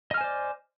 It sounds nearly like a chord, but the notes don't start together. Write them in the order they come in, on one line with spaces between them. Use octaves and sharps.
D#5 F6 G#5 C5 D5